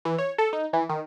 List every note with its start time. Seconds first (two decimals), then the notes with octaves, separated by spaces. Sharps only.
0.05 E3
0.18 C#5
0.38 A4
0.53 D#4
0.73 E3
0.89 D#3